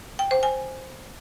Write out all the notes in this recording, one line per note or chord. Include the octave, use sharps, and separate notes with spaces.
G5
C5
G#5